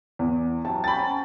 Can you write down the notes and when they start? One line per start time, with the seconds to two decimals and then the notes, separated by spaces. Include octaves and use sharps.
0.19 E2
0.65 C3 F#3 A5
0.84 C#4 G5 A#5 B5 A6